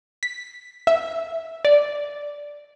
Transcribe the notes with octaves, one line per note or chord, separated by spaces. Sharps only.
B6
E5
D5